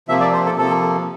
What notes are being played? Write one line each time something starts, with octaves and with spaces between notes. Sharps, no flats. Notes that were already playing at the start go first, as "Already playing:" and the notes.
C3 F3 A#3 E5
D5
C5
A4
C3 F3 A#3 A4